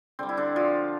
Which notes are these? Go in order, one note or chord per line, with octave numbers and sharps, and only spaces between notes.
D3 G3 C4
E4
D3 D4
F3 F4